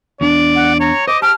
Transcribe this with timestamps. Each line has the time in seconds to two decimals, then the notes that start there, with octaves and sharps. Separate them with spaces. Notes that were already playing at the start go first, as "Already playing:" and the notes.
0.21 E2 D4 D5
0.55 F#5
0.80 C#5 A#5
1.08 C5 D#5 D6
1.22 G4 A5 F6